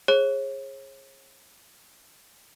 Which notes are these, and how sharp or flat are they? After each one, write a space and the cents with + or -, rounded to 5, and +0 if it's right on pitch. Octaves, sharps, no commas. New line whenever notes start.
G#4 +0 C#5 -40